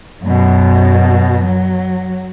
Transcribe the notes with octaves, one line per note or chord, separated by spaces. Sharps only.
F#2 B2
F#3